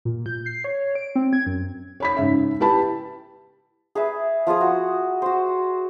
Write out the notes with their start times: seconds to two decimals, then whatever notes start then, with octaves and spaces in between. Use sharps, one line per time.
0.05 A#2
0.26 G6
0.46 C7
0.64 C#5
0.95 D7
1.15 C4
1.33 G#6
1.46 F#2
2.00 C#5 B5 B6
2.17 G#2 C#3 E5
2.60 E4 G4 B4 A5 B5
3.95 G#4 B4 E5
4.47 F3 F4 G#4 D#6
4.61 F#4
5.22 F#4 C5